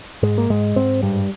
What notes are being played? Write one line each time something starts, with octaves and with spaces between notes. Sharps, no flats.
G#2 G#3
A#3
G#2 G#3
G#2 C4
G2 G3